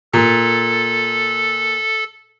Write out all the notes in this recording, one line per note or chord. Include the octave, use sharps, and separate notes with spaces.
A#2 A4